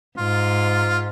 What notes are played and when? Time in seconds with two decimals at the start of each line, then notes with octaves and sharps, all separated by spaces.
0.18 G#2 F4